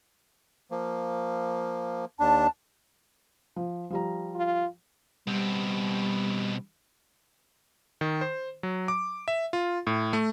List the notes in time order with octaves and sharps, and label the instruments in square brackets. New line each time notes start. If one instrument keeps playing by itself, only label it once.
[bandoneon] F3 A#3
[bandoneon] D#2 D4 [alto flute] A5
[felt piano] F3
F3 G3 A#5
[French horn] F4
[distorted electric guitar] B2 C4 [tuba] G3
[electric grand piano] D#3
C5
F#3
D6
E5
F4
A2
A3